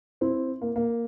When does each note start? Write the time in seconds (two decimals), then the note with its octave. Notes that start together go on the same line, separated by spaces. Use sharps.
0.21 C4 E4
0.61 A#3
0.76 A#3